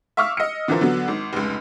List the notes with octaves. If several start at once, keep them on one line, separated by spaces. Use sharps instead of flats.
E5 F5 C#6 D6 E6 F6
D#5 C#7
D3 E3 F3 F4 A#4 C5
D3 F#3 B3
G#1
F1 C#2